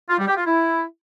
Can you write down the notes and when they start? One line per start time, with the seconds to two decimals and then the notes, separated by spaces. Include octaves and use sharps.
0.10 F4
0.19 G3
0.28 G4
0.37 F4
0.46 E4